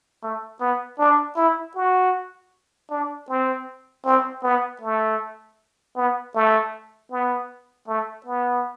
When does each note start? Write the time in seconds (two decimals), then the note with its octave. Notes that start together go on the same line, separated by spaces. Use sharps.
0.22 A3
0.60 B3
0.99 D4
1.36 E4
1.75 F#4
2.90 D4
3.29 C4
4.05 C4
4.43 B3
4.81 A3
5.96 B3
6.35 A3
7.11 B3
7.88 A3
8.26 B3